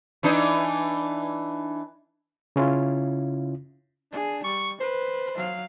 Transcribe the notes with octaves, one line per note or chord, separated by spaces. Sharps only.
E3 D4 D#4
C#3 C#4 E4 F4
D4 G#4
G3 C#6
B4 C5
F#3 F5